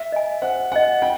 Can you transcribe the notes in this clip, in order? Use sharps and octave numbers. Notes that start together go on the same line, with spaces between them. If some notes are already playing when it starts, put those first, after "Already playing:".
Already playing: E5
D#5 G#5
C5 F#5
D#5 F#5 G#5
F4 G5